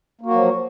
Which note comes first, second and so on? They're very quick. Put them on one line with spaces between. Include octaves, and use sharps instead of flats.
A#3 F#4 F#3 F3